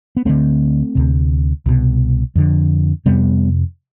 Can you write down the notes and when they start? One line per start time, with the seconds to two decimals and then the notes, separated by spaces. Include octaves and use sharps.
0.17 B3
0.25 D2 D3 A3 C4
0.95 D2 C3
1.66 C2 B2
2.35 F2 D3
3.06 F2 C3 G3 B3